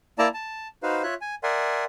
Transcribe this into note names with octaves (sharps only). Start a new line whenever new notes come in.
A#3 E4 D5 A5 A#5
A5
D#4 F#4 B4 C5 F5
F4 C#5 E5 F#6
G#5
A#4 D5 E5 F#5 G#5 C6